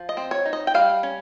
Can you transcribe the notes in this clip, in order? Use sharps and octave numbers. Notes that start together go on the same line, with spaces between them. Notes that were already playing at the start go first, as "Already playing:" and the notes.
Already playing: F3
D#5
C4
C#5
D#4
D#5
G5
G3 F5
C#4